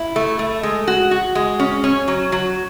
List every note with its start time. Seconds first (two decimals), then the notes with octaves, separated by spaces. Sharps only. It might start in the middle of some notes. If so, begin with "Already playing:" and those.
Already playing: E4
0.16 A3
0.39 A3
0.63 G#3
0.88 F#4
1.11 F#4
1.35 G#3
1.60 C#4
1.84 C#4
2.08 F#3
2.32 F#3